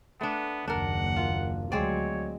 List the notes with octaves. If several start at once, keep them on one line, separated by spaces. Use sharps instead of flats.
A3 B3 D4
F#1 D#2 D4 A#4 F#5
F4
D2 F#3 G#3 C4 C#5 D5